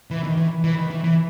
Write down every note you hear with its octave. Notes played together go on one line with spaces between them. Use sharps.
E3
D#3
E3
E3
D#3
E3
E3